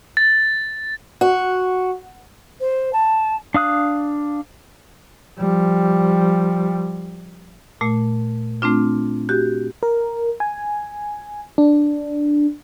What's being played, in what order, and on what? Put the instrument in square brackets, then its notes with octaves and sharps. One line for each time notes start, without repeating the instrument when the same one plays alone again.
[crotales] A6
[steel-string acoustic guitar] F#4
[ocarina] C5
A5
[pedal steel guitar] D4 F5 D#6 F#6
[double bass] F3 G3
[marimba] A#2 A3
A3 C4 D4 F4
F#4 G4
[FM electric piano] A#4
G#5
D4